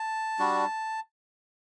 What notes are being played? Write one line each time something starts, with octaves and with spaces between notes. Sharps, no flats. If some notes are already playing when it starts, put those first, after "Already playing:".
Already playing: A5
G3 D4 F#4